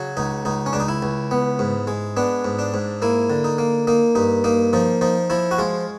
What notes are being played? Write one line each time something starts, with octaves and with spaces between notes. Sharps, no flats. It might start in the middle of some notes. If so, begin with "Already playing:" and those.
Already playing: C#3 F#3
C#2 D#4
C#2 D#4
C#4
C#2 D4
D#4
E4
C#2
B3
G#2
G#3
B3 D4
G#2
D4
G#2
A#3 E4
D3
D#4
A#3
A#3 D#4
G2 D#4
A#3 D#4
F3 D#4
F3 D#4
F3 E4
F#4
G#3 F4